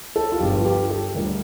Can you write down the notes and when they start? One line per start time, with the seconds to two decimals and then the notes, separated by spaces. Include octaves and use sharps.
0.16 A4
0.32 F4
0.40 G1 G2 F3 G4
0.61 F4
0.65 G4
0.90 A4
1.15 D2 D3 G3 A#4